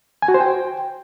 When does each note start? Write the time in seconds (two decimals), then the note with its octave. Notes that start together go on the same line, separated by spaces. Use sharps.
0.22 G#5
0.28 F#4
0.34 C5
0.40 G5